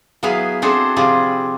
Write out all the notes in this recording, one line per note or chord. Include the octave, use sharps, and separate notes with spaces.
F#3 B3 E4 G#4 B4 F5
C4 D4 F#4 G#4 A4 C5
C3 F3 G3 C4 F4 G#4